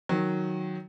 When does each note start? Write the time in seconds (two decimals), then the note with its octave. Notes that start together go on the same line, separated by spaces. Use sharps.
0.09 D#3 F#3